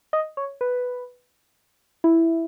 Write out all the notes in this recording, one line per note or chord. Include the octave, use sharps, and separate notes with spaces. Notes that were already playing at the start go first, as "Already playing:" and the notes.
D#5
C#5
B4
E4